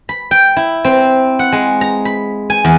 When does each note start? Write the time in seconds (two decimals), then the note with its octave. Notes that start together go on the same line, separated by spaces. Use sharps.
0.09 B5
0.31 G5
0.57 E4
0.85 C4
1.39 F#5
1.52 G#3
1.81 A#5
2.05 B5
2.50 G#5
2.65 E2